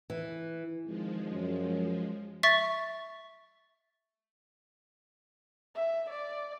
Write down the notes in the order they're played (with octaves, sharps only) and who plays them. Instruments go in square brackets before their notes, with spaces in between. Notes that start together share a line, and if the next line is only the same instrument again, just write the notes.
[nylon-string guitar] E3
[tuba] G#1 [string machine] F3 G#3
[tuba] F#2
[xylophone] E5 C#6 A6 B6
[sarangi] E5
D5